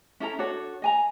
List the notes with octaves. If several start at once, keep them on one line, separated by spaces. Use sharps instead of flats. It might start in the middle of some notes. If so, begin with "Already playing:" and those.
C#4 E4 A4 A#5
D4 F#4 A4 C#5
D#5 G#5 A#5